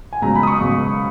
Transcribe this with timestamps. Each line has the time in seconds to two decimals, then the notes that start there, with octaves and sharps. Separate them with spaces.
0.13 G#5
0.22 C#2 B2 F#3 A#5
0.35 B5
0.43 D#6
0.47 C#6
0.59 C#2 B2 F#3